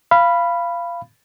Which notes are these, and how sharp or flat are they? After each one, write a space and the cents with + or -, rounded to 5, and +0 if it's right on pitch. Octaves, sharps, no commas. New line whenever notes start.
F5 -20 B5 +0